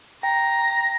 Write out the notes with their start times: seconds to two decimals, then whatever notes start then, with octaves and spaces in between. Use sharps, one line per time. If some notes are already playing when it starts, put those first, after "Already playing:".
0.23 G5 A#5 A#6